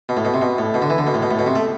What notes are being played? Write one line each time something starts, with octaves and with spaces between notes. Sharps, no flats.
B2
A2
B2
C3
B2
A2
B2
D3
E3
D3
B2
A2
B2
A2
B2
C3
A3